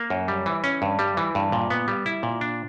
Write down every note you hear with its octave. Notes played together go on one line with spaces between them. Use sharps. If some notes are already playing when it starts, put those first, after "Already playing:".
Already playing: A#3
F#2
G3
E3
C#4
G2
G3
E3
G2
A#2
B3
G3
E4
A#2
D4